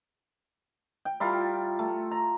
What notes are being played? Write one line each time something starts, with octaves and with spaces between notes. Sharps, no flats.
G5
G3 E4 F4 A#4
A3
A#5